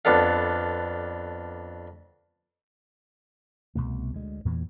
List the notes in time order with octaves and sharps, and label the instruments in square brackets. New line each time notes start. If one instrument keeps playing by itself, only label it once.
[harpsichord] F2 B3 D4 A4 F5
[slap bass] C2 F2 B2 A3
D2 G#3
E2 A#2 E3